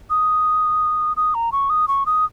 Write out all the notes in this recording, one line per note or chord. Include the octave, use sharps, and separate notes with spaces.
D#6
D#6
A#5
C#6
D#6
C#6
D#6